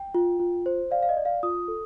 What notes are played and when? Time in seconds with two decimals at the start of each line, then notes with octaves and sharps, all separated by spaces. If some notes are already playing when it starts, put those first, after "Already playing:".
Already playing: G5
0.15 F4
0.40 F4
0.66 C5
0.91 D5 F5
1.03 F5
1.09 D#5
1.17 D5
1.25 F5
1.43 F4 D#6
1.68 A4